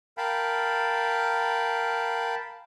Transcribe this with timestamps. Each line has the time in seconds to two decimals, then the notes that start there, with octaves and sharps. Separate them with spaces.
0.18 A#4 F5 G5 A5 B5